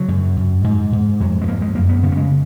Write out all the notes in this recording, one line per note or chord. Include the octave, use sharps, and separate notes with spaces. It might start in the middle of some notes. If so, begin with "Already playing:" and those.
Already playing: C#3 F#3
F#2
F#2
G#2
G#2
F2 F#3
G#3
F2 A#3
G#3
F#2 A#3
B3
C#3 B3
A#3
G#3